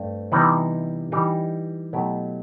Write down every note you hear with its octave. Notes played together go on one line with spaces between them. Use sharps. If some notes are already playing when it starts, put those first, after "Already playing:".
Already playing: G2 A3 C4
C3 E3 G3 B3 D#4
E3 G3 D#4 G4
B2 F#3 A3 E4 G4